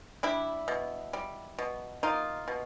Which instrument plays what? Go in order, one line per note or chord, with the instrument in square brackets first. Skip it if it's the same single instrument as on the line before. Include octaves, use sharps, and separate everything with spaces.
[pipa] G3 D4 E4
B2
G3
B2
A#3 D#4 F4
B2